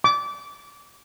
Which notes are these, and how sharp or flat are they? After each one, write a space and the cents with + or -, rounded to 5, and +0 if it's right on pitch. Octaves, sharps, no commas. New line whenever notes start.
D6 -20